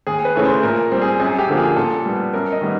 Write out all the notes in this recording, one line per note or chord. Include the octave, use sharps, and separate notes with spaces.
D#2 G#4
B4
C#3 E3 A3 C#5
C5
A#2 A#4
G3 C4
G#4
F#2 G#4
G4
D3 F3 A#3
G#4
A#2 A4
G3 B3
F#2 A#4
D#5
D#3 G3 B3